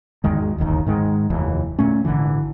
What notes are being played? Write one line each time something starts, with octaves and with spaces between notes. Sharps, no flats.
G#1 E2 D#3 G#3
D1 G1 D#2 D#3
G#2 D#3 G#3
F1 D#2 E3
A#2 A3 C#4
G#1 A#2 D3 E3